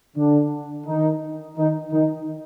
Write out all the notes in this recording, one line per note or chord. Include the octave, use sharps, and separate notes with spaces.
D3 D4
D#3 D#4
D#3 D#4
D#3 D#4